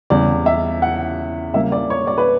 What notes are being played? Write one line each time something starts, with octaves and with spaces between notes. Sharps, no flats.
E2 C#3 G3 D5
E5
F#5
C#3 G3 A#3 E5
D5
C#5
D5
B4